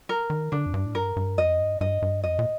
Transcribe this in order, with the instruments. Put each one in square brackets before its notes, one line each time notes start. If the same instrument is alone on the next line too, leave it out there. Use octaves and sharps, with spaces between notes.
[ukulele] A#4
[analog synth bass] D#3
[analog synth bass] D3 [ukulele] D4
[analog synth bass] F2
G2
A2
[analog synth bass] G2 [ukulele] A#4
[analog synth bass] G2
[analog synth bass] F2 [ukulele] D#5
[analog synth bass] G2
[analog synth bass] G2 [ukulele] D#5
[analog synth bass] G2
[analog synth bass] F2 [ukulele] D#5
[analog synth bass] A#2